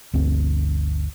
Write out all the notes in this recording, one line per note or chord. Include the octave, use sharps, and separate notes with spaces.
G1 D2 C4